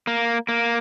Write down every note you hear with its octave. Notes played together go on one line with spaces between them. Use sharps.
A#3
A#3